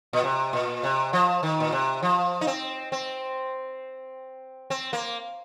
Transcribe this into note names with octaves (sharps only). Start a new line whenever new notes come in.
A#2
C3
A#2
C3
F3
D#3
A#2
C3
F3
D#4
C4
C4
C4
A#3